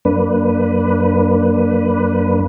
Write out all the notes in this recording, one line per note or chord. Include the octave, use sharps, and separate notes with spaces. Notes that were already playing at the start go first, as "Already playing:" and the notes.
F#2 A#3 D4 B4